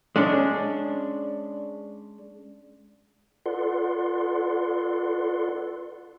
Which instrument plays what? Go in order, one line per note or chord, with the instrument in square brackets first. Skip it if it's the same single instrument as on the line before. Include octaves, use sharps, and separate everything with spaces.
[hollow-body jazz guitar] G#3 C#4 D4
[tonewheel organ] F4 A4 B4 D5 F#5 C6